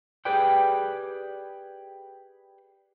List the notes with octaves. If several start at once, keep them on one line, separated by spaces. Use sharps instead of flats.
G4 G#4 B4 D5 G5